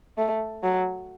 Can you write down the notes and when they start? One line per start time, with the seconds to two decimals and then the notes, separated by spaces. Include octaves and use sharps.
0.18 A3
0.63 F#3